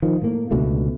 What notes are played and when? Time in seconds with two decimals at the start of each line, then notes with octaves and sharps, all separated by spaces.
0.02 D#3 F3
0.22 A2 A#3
0.51 C#2 B2 D3 A3